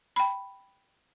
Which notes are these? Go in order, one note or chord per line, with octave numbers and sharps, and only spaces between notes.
G5 B5